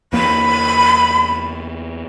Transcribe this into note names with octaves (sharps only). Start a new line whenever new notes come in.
E2 A#3 B5